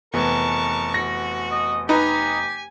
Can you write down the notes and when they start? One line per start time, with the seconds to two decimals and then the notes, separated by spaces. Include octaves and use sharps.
0.14 F1 E3 B3 A#4 A5 C#6
0.94 F#4 A#6
1.51 D#5
1.89 D#4 G4 B4 G#5 A#5